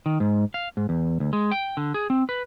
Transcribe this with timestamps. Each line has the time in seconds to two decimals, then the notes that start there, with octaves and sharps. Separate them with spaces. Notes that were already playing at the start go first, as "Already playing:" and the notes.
0.06 D#3
0.20 G#2
0.54 F5
0.77 G#2
0.89 E2
1.20 D2
1.33 G#3
1.51 G5
1.77 D3
1.94 G#4
2.10 C4
2.29 B4